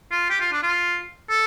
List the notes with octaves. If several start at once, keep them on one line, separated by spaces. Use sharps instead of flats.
F4
G4
F4
D4
F4
A4